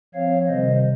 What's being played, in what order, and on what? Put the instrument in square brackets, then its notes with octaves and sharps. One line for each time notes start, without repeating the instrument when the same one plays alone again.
[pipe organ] F3 C4 C#5 F5
C3 D#3 G3 C5 D#5